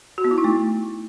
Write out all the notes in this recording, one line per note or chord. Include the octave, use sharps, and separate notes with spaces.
F#4
B3
E4
D#4
A3